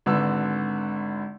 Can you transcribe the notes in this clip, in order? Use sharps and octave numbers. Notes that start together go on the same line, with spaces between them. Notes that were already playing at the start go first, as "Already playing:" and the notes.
G#1 D3 D4 B4 E6